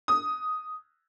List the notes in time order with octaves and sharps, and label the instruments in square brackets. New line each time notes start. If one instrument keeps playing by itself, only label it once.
[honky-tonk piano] D#6